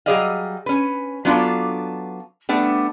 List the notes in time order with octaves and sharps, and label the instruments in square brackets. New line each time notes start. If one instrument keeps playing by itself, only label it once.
[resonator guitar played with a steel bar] F#3 G3 G#4 D5 D#5 F5
C#4 B4
F#3 B3 D4 F4 A4 D5
G3 A3 B3 D4